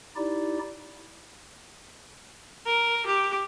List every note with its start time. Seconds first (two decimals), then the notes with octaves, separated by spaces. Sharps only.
0.16 D#4 E4 G4 D5
2.66 A#4
3.07 G4